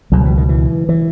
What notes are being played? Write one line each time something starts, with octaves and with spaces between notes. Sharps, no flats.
C#2 B2 F#3
E3
D#3
E3
E3